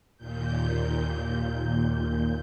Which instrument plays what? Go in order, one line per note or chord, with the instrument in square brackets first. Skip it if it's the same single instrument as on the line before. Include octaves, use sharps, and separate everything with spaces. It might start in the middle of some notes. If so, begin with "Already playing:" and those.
[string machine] D#2 A#2 G6